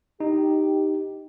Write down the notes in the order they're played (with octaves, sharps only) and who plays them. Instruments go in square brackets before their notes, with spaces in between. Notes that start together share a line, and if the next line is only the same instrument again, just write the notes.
[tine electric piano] D#4 [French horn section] G4